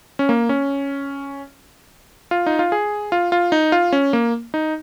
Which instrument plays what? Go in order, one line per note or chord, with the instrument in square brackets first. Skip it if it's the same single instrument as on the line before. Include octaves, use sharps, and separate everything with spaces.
[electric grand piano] C#4
A#3
C#4
F4
D#4
F4
G#4
F4
F4
D#4
F4
C#4
A#3
D#4